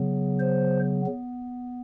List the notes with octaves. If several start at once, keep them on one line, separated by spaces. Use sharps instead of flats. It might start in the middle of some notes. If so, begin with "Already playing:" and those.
Already playing: C#3 F#3 B3
C5
B3